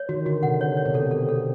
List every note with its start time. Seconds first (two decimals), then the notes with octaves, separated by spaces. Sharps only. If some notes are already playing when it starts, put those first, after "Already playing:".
Already playing: C#5
0.09 D#3 F#4
0.26 D3 F#4
0.43 C3 F#5
0.61 C#5
0.77 C#5
0.86 B2
0.94 C3 A4
1.11 A4
1.29 A4